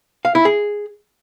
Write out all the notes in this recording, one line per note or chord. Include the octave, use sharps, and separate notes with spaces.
F5
E4
G#4